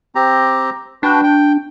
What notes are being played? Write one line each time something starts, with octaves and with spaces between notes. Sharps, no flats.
C4 G4 A#5
D4 F#4 B4 G5
G5